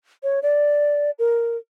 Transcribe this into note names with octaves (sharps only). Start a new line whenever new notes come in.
C#5
D5
A#4